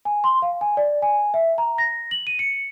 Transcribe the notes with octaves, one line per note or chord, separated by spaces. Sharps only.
G#5
C6
F5
G#5
D5
G#5
E5
A#5
A#6
F#7
D#7
C#7